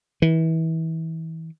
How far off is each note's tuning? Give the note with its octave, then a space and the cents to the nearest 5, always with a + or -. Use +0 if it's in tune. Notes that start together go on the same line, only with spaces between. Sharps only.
E3 -30